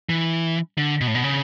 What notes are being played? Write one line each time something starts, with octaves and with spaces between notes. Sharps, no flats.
E3
D3
B2
A2
B2
C#3